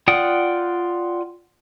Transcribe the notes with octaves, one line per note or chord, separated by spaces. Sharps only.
F4 D5 F#5 G5 D#6